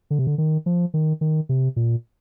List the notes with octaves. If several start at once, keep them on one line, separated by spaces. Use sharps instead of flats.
D3
C3
D3
D#3
F3
D#3
D#3
C3
A#2